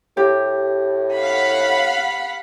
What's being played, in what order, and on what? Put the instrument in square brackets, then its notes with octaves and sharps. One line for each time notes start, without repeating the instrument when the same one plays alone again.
[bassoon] A2 [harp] G4
[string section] F5 F#5 B5